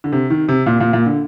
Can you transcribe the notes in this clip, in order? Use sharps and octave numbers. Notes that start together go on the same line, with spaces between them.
D3
C3
D#3
C3
A#2
A#2
A#2
D3